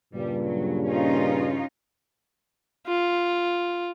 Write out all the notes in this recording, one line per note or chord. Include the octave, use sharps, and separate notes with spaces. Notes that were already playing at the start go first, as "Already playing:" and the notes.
G2 A#2 C#3 G3
F#3
C#4 D#4 F4
F4